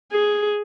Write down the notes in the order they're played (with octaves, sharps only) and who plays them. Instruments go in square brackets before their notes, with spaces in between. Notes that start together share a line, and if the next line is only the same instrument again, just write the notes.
[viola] G#4